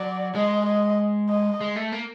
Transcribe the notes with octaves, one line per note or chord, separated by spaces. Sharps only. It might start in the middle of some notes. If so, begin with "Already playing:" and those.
Already playing: F#3 D5
G#3 D#5
D#5
D#5
G#3
A3
A#3